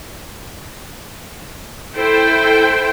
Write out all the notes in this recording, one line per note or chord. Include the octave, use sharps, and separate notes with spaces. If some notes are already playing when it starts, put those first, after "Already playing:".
E4 A4 C5 G5